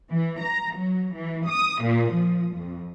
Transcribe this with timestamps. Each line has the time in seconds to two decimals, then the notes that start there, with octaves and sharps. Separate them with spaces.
0.10 E3
0.41 A#5
0.76 F#3
1.14 E3
1.47 D#6
1.82 A#2
2.12 F3
2.55 F2